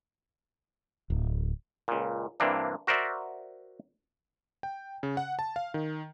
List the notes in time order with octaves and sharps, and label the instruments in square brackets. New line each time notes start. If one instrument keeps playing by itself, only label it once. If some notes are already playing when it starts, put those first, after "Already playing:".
[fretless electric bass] D1
[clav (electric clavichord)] C#2 A#2
G2 C3 E3 A#3 D4
F#4 A#4 C5 D5 E5
[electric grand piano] G5
C#3
F#5
A5
F5
D#3